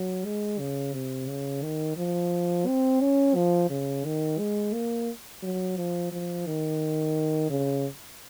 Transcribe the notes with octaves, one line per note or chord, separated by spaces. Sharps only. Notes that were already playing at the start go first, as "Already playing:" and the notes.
Already playing: F#3
G#3
C#3
C3
C#3
D#3
F3
C4
C#4
F3
C#3
D#3
G#3
A#3
F#3
F3
F3
D#3
C#3